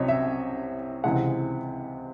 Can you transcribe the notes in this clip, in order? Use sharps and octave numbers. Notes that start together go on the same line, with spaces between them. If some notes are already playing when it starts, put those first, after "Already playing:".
Already playing: C2 C3 F#3 C4 C#5 D#5
E5
C#2 C3 E3 G#3 F#5